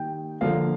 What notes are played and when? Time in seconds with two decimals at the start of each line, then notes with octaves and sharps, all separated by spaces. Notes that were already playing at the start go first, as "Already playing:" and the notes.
Already playing: D#3 G3 A#3 G5
0.41 D3 F3 A#3 F5